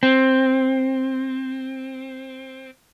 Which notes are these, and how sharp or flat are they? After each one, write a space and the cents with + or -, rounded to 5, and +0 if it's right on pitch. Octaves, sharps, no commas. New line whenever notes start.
C4 +10